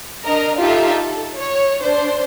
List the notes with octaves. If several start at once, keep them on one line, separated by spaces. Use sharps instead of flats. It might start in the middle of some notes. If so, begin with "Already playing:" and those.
D4 A#4 D#5 A#5
D#4 F4 G4 A4 E5
A4
C#5
D4 C5